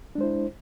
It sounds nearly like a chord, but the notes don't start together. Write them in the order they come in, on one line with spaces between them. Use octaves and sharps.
D4 G#3 C5 E4